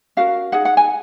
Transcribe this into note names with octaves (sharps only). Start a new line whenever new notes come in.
C#4 F#4 A#4 F5
D#4 G#4 F#5
F#5
G#5